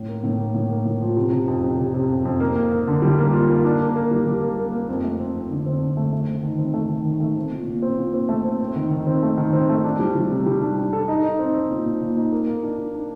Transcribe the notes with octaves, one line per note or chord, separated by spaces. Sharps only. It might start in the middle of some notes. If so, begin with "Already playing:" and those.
Already playing: A2
A#3
A2
A#3
A2
A#3
A2
F3
C3
C3
F2
C3
C3
C3
F2
F2
A#3
A#3
A#3
D3
G3
A#3
F4
A#3
D4
A#3
A#3
G3
G3
A#3
A#3
A#3
F2
A3
C4
F2
D3
C4
D3
A3
A3
A3
D#3
C4
A3
D#3
D#3
A3
C4
A#2
A#2
C4
A#2
C4
A3
C4
C4
D#3
D#3
C4
A3
D#3
C4
A3
D4
G3
G3
C3
G3
D4
D4
A4
D#4
D#4
C4
C4
A#2
A#2
A#2
D#4
A#3
A#3
D4
D4
D4